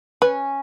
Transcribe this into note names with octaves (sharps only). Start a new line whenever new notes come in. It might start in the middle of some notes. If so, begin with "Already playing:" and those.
C#4 B4